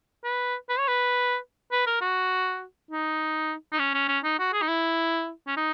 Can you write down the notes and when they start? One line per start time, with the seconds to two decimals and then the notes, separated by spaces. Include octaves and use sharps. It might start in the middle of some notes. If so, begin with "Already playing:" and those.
0.24 B4
0.69 B4
0.79 C#5
0.88 B4
1.72 B4
1.87 A#4
2.01 F#4
2.91 D#4
3.73 D#4
3.79 C#4
3.94 C#4
4.09 C#4
4.24 D#4
4.39 F#4
4.53 G#4
4.62 D#4
4.68 E4
5.47 C#4
5.57 D#4